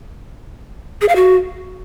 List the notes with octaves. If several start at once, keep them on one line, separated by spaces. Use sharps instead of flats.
G#4
F5
F#4